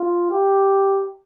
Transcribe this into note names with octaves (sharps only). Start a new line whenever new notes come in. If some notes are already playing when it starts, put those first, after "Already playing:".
Already playing: F4
G4